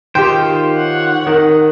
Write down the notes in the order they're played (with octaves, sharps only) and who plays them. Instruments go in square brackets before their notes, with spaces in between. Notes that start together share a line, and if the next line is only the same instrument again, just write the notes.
[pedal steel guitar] D#3 F4 C5 [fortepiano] G4 G5
[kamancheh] C#5 F#5
[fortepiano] D#3